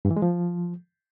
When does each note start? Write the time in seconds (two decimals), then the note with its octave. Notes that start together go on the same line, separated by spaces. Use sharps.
0.05 G2
0.11 E3
0.16 G#3
0.22 F3